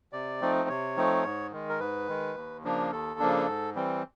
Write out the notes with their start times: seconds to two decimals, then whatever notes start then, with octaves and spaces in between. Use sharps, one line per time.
0.13 C3 D5
0.41 F3 A3 C4 D#4
0.69 C3 C#5
0.96 F3 A3 C4 D#4
1.24 G#2
1.52 D#3 G#3
1.69 A#4
1.80 G#2 B4
2.08 D#3 G#3
2.36 D#2
2.64 C#3 F3 A#3 D4
2.92 D#2 A4
3.20 C#3 F3 A#3 D4
3.48 G#2
3.75 E3 G3 C4